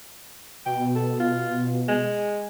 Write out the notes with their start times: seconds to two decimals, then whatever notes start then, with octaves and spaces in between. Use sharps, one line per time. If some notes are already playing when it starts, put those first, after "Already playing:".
0.66 B2 G5
0.96 A4
1.20 F4
1.88 G#3